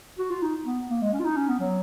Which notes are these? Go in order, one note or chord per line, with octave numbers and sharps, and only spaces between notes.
F#4
F4
D#4
B3
A#3
G#3
C#4
F4
D#4
C#4
B3
F#3